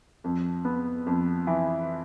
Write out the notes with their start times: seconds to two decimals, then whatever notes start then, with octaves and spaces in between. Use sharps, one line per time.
0.24 F2
0.65 B3
1.06 F2
1.47 E3